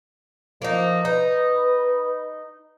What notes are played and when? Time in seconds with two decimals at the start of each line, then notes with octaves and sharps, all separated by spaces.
0.62 F3 A#3 D#4
1.05 D#4 B4